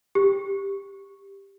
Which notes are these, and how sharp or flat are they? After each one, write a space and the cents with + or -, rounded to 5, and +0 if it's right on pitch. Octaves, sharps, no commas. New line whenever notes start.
G4 +10